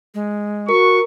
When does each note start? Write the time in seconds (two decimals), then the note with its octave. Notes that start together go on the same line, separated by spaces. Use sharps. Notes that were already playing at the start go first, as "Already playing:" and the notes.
0.14 G#3
0.69 F#4 A#4 C#6